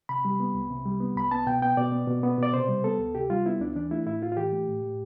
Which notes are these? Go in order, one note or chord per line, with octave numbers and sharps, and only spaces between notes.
C3 B5
G3
B3
C2
C3
G3
B3
C2 B5
B3 A5
B2 G5
B3 G5
B2 D5
B3
B2
B3
B2 D5
C3 C5
G3
B3 A4
D2
C3 G4
G3 F4
B3 E4
D2 D4
E3 D4
A3 E4
A2 E4
A2 F4
F4
E3 G4
A3
A2
A2